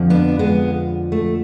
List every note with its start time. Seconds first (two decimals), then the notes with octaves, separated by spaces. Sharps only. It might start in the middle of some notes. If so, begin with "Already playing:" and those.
Already playing: F2 D3 F3
0.10 B3 D4
0.39 G#3 B3
1.12 A3